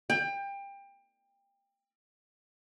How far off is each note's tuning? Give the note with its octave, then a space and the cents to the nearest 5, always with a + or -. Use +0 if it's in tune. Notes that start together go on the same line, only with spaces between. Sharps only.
G5 +25